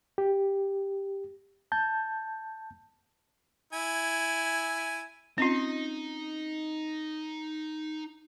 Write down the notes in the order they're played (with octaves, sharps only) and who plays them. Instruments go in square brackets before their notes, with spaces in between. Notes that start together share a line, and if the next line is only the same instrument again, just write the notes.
[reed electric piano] G4
A5 G6
[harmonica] E4 G#5
[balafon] C4 C#4 F4 [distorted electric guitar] D#4